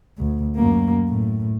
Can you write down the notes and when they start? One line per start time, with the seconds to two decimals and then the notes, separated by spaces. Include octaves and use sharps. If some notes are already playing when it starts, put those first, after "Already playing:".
0.18 D2
0.56 F#2 A#3
1.08 A2